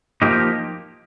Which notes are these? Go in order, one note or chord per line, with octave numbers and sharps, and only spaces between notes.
F3 A#3 D#4 G4